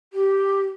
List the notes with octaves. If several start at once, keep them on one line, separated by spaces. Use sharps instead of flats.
G4